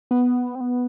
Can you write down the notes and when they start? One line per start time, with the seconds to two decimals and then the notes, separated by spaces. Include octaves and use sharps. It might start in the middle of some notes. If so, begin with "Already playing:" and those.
0.11 B3
0.55 C4
0.61 B3